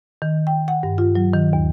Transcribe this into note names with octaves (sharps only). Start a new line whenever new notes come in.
D#3
G5
F#5
G2
F4
F#3
D#3
D#2